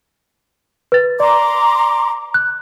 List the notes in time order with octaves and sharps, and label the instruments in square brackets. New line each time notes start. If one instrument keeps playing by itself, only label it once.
[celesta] B4 A6
[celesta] D5 [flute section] A#5 C6 D6
[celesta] F#6